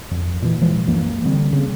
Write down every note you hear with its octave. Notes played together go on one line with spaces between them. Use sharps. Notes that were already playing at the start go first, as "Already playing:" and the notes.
F2
A#2 E3
A#2 E3 F3 G#3
C#2 F#2 E3 A#3
D3 G3 C4
C#3